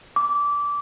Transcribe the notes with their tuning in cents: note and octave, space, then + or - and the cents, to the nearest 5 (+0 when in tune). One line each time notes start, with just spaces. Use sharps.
D6 -20